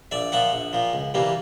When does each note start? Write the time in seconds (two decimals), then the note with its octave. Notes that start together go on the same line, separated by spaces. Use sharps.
0.11 A#1 D5 E5
0.32 A#2 F3 E5 F#5
0.53 A#1
0.73 A#2 F3
0.93 C#2
1.14 C3 E3 G3 A#3